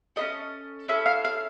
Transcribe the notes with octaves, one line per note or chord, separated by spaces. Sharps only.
C#4 E4 A4 D#5
C#4 E4 A4 E5
F5
F5